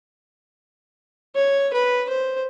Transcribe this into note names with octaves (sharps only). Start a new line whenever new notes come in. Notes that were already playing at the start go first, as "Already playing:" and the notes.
C#5
B4
C5